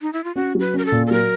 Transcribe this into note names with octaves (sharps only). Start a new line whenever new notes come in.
D#4
E4
F4
C#4 F#4
F#3
B4
C#4 A#4
A4
A#2
A4
F#3 A#4